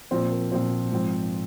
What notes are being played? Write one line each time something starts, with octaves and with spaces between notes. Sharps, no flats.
A#2 F3 C4 C5
A#4
A#2 F3 C4 C5
G#2 F3 C4